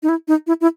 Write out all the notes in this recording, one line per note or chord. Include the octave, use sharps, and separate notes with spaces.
D#4
E4
D#4
E4
E4